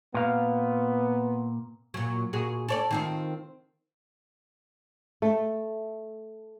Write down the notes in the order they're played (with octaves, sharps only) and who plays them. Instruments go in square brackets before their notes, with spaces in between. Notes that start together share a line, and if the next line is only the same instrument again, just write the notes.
[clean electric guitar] A#2 F5 [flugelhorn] B3
[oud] A#2 F#3
A#2 F#4 G#4
A4 C#5 D5
D#3 C4 F4
[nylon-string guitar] A3